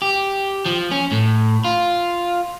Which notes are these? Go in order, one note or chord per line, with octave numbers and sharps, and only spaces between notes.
G4
F3
C#4
A2
F4